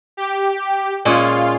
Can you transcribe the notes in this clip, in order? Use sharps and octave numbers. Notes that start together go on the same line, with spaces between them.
G4
A#2 G#3 C#4 F4